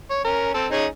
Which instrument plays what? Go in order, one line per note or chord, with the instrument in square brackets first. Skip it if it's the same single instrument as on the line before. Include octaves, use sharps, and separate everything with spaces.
[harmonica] C#5
C#4 A#4
C4 A4
C#4 D#4 G#4